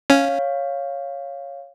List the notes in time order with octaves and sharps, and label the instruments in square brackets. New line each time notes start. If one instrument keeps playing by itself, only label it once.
[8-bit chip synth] C#4 [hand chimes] C#5 F5